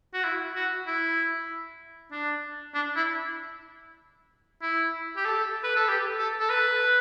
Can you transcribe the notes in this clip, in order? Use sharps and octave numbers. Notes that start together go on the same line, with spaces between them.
F#4
E4
F#4
E4
D4
D4
E4
E4
G4
A4
B4
A4
G4
A4
A4
B4